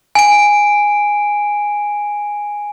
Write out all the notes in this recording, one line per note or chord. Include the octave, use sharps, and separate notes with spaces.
G#5 D7